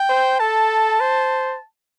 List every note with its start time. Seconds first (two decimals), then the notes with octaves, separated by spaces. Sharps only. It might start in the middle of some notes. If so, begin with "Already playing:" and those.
Already playing: G5
0.09 C5
0.39 A4 A5
1.00 C5